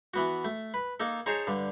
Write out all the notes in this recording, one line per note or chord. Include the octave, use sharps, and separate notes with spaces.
E3 B3 F#4
A3
B4
A#3 D#4 A4
D#4 G#4 C5 C#5 A5 A#5
G2 D3